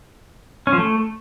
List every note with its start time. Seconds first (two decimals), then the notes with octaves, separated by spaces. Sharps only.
0.67 C#4
0.73 F3
0.78 A3